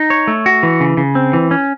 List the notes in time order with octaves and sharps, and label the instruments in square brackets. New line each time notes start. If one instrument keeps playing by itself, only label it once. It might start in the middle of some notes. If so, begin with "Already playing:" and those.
Already playing: [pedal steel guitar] D#4
C#5
A3
F#4
E3
C#3
C#3
C4
E3
C#4